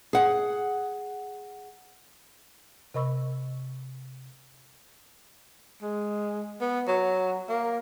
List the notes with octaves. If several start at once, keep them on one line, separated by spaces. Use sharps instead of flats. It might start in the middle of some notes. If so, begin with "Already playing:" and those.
G#4 F#5
C3 A#4 D#5 B5 C#6 E6
G#3
B3
F#3
A#3